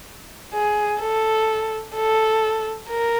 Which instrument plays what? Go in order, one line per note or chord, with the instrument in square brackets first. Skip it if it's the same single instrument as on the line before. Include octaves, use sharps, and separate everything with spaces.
[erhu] G#4
A4
A4
A#4